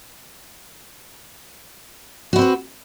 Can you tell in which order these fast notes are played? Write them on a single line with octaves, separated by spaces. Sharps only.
F#4 E4 C4 B4